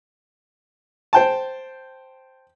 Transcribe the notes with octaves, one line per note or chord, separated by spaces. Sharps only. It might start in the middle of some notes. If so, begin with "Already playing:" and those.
C5 G5 A5